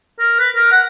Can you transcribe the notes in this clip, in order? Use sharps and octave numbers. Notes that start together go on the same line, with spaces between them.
A#4
B4
A#4
F#5